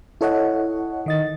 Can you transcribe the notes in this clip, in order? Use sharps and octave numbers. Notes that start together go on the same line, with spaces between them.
E4 A4 C#5 D#5 F#5
D#3 D#5 A6